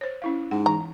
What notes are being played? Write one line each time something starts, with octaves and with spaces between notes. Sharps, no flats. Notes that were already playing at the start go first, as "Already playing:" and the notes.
C5 C#5
C#4 E4 F5
G#2 F#5
E3 A#5